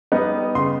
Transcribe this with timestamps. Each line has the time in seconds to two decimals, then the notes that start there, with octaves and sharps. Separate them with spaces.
0.12 G3 B3 D#4
0.55 C#3 C6